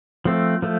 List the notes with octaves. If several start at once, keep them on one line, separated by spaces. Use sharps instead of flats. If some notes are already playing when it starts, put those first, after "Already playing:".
F3 A3 C4
F3 A3